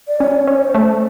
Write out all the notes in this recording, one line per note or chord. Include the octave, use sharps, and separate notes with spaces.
D5
C#4 C#5
C#4
C5
A3